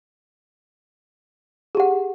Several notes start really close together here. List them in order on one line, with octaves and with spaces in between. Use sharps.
G#4 G4 F#5